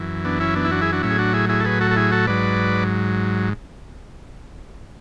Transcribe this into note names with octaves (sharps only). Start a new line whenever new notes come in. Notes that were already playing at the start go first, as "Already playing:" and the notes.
Already playing: F#2 E3
B3 D4
C#4 E4
B3 D4
E4
D4 F#4
E4 G#4
D4 F#4
A2 F#3 C#4 E4
G#4
D4 F#4
E4 G#4
E4 G#4
A4
G#4 B4
F#4 A4
A4
E4 G#4
F#4 A4
G#2 F#3 B4 D5